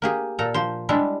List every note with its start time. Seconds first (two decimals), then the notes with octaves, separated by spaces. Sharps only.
0.02 A#3 G4 G#4
0.39 A#2 A4 A#5
0.54 F3 C5
0.89 G3 G#3 D4 E4